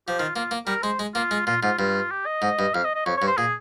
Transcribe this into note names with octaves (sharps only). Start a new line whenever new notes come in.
F3 G4
D#3 F4
A#3 F4
A#3
G3 A#4
G#3 C5
G#3
A#3 F4
G#3
A#2 F4
G#2 F4
G2 F4
G4
D#5
G#2
G2
F2 F5
D#5
D#5
F2 C#5
G2 C#5
C5
A#2 G#4